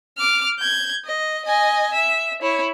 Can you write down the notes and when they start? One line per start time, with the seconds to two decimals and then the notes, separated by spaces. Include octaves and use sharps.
0.17 D6 F6
0.59 G6 G#6
1.05 D#5
1.45 D#5 G#5
1.94 E5
2.42 E4 C#5